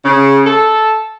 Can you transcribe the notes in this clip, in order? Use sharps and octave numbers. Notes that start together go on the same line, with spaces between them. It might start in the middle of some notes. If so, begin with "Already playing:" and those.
C#3
A4